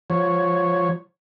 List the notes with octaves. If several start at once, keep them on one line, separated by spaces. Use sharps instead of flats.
F3 C#5